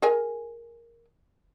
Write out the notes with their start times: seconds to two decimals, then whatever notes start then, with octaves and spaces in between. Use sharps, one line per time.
0.02 G#4 A#4 G#5